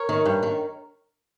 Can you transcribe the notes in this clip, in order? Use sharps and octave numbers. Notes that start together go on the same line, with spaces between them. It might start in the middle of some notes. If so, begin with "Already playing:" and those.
Already playing: A#4 C#5
D#3
G2
D#3